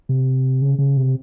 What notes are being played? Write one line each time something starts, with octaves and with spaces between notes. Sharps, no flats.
C3
C#3
C#3
C3